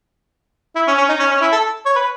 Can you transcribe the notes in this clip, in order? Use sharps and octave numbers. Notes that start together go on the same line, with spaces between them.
E4
C#4
C#4
D#4
C#4
C#4
E4
A4
C#5
B4